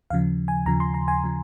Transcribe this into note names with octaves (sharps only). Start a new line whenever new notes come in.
D#2 C#3 F3 F5
G#5
D#2 C#3 F3 A#5
C6
A#5
G#5
C#3 F3